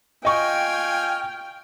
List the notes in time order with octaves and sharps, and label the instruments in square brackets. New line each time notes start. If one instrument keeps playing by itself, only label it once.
[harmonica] F4 G#5 F6 [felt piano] D#5 C#6 [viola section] G5